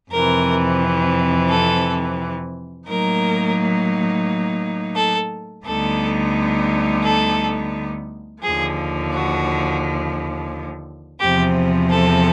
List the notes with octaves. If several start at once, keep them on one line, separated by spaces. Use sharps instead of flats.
F2 C3 E3 A#4
A4
A2 F#3 A#3 D#4 A#4
A4
D2 D3 G3 B3 D#4 A4
A4
D#2 D3 F3 G#4
F#4
E2 C3 F3 G4
A4